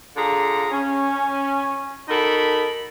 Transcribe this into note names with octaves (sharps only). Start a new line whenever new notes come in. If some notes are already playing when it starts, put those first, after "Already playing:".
D3 F4 G#4 A#5
C#4
D#4 F#4 A4 A#4 B5